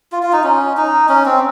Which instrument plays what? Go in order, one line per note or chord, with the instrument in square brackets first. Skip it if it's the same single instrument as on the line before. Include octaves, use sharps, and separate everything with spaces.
[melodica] F4
F4
D#4
C#4
D#4
C#4
C4